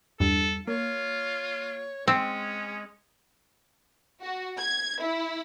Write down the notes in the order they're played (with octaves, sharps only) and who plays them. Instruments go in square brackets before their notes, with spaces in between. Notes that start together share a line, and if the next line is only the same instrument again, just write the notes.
[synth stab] E2 G2 [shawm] A4
[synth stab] A#3 [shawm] F4 [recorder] C#5
[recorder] G#3 [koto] C4 [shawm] C#4
[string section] F#4
G#6
E4